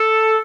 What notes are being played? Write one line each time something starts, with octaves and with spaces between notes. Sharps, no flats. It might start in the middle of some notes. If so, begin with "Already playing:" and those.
Already playing: A4